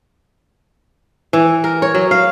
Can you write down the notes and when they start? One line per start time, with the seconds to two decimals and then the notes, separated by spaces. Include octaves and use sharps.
1.33 E3
1.64 A#4
1.82 C#5
1.95 F#3
2.11 F5